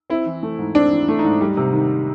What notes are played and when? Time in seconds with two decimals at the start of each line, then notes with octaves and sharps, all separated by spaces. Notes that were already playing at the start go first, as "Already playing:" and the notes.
0.10 C4 E4
0.26 E3
0.43 A3
0.59 G#2
0.75 C4 D4
0.92 E3
1.08 A3
1.19 D#4
1.25 G#2
1.41 G3
1.57 C3
1.73 D#3